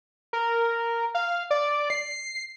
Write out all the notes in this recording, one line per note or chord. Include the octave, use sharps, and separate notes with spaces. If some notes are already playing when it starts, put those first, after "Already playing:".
A#4
F5
D5
C7